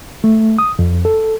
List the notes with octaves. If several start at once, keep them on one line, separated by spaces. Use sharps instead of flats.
A3
D#6
F2
A4